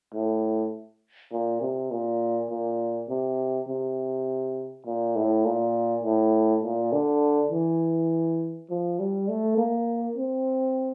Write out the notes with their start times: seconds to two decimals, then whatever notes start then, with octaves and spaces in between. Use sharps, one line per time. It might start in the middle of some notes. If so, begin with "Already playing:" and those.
0.14 A2
1.32 A#2
1.61 C3
1.91 A#2
2.50 A#2
3.09 C3
3.68 C3
4.86 A#2
5.16 A2
5.45 A#2
6.03 A2
6.63 A#2
6.93 D3
7.51 E3
8.70 F3
8.99 G3
9.28 A3
9.58 A#3
10.17 C4